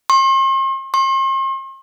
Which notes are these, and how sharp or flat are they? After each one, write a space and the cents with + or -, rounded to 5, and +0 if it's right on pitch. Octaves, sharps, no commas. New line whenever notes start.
C6 +45
C6 +45